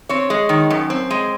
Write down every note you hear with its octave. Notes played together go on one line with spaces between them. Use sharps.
C4 C#5
G#3
D#3
F#2
C4
G#3